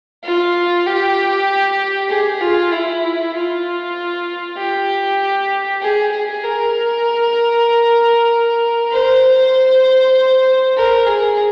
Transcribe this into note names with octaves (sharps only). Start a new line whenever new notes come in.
F4
G4
G#4
F4
E4
F4
G4
G#4
G#4
A#4
C5
A#4
G#4